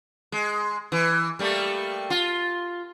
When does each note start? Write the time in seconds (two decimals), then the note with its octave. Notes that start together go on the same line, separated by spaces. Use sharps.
0.32 G#3
0.92 E3
1.39 G3 A3 A#3
2.10 F4